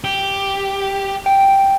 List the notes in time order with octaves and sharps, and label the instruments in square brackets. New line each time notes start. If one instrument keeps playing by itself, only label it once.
[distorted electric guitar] G4
[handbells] G5